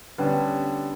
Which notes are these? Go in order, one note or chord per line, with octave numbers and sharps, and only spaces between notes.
D3 G3 B3 C#4